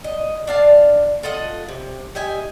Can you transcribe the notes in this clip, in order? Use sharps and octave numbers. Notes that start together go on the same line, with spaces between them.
D#5
D4 F5 A5
F4 A4 D#5 F#5
C3
G4 D#5 E5 G#5